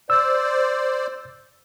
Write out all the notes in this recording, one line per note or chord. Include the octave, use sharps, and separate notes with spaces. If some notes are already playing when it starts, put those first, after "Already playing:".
C5 D5 E6